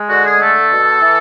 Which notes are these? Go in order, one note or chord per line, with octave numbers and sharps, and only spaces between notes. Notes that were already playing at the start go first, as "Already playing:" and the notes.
Already playing: G#3
D3 F#4
G#4
A3 A4
B2
E3